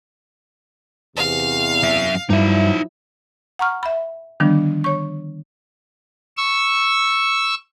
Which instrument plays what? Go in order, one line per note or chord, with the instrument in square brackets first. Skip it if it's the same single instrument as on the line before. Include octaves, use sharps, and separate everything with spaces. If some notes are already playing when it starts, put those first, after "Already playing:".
[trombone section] E2 C3 [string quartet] F5
[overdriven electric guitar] F#2 E5
[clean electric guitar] G2 [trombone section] F3 F#3 E4 [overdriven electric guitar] D#4 E5
[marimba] F#5 A#5 C#6 F6
E5 B5
D3 D#3 F3 G3 B3 D4
C#5 C#6
[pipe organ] C#6 E6